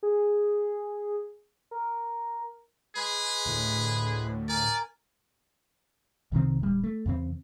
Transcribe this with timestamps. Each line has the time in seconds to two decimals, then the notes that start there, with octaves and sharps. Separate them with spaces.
0.03 G#4
1.71 A#4
2.96 G#3 G#4 B4 B5
3.45 D2 A2
4.49 A#4 D5 G#5
6.32 C2 C3 D#3 C4
6.60 D1 G3
6.83 A3
7.06 E2 C#3 C4